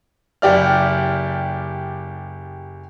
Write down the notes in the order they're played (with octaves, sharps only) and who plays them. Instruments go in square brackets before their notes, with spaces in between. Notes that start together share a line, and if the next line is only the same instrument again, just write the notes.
[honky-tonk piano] F#1 G4 D5 F6